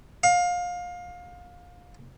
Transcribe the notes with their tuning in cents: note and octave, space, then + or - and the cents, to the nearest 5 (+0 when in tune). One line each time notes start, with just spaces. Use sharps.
F5 +25